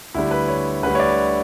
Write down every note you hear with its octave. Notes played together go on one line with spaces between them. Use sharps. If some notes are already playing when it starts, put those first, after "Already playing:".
D2 D3 G3 E4
B4
C#5
D2 D3 G3 B4
C#5
D5